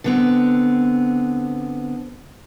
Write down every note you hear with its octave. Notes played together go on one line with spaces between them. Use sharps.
D3 B3 C4